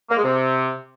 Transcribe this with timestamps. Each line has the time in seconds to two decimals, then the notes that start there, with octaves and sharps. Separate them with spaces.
0.10 A#3
0.17 G#3
0.24 C3